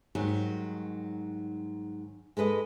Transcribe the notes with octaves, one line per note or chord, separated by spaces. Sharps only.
G#2 D#3 F#3 G3 F#4
G#3 A4 B4 D#5